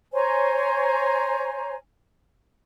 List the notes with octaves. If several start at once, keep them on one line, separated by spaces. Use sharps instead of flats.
C5 C#5 G#5 A#5